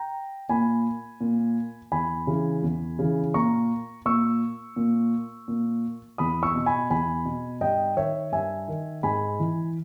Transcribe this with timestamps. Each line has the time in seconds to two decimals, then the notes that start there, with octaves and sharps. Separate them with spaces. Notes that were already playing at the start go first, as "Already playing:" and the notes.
Already playing: G5 A#5
0.49 A#2 G#5 B5
1.21 A#2
1.92 E2 G#5 B5
2.27 C#3 E3
2.63 E2
2.99 C#3 E3
3.34 A#2 A#5 C#6
4.06 A#2 C#6 E6
4.76 A#2
5.48 A#2
6.18 E2 B5 D#6
6.43 C#6 E6
6.55 B2
6.66 G#5 B5
6.90 E2 G#5 B5
7.25 B2
7.61 G2 D#5 G5
7.97 D#3 C#5 E5
8.32 G2 E5 G#5
8.68 D#3
9.03 G#2 G#5 B5
9.40 E3